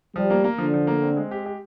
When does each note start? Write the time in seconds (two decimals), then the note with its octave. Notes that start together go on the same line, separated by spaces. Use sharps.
0.15 F3 G3
0.30 A#3
0.44 A#3
0.58 D3 F3
0.74 F3
0.87 A#3
1.02 C4
1.17 G#3
1.31 G4
1.46 G4